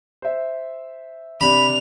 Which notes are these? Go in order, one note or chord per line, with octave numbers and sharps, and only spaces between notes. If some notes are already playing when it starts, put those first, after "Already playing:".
C5 E5
C3 D4 B5 F7